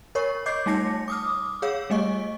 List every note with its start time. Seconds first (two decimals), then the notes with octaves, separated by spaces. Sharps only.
0.15 A#4 C#5 C#6
0.46 C#5 D#5 D6 G6 C7
0.66 G3 A3 D#4 A5 A#6 C#7
1.08 D6 D#6 F6
1.62 G#4 C#5 F5 E6
1.90 G3 A3 D#5 C#6